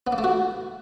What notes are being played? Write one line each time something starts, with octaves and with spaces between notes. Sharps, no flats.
B3
A#3
A3
F#4